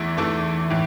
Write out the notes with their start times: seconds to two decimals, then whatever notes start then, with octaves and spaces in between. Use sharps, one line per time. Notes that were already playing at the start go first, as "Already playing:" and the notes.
Already playing: E2 E3 A3 E4
0.17 E2 E3 A3 E4 A4
0.70 A2 E3